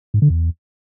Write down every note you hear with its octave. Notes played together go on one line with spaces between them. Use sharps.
G#2
D3
E2